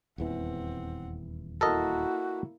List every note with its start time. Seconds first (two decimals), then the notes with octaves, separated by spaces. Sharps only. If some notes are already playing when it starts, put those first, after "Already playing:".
0.18 D#1 E2 E3 C4 F#5
1.61 A#3 E4 F#4 A4 A#4 D#5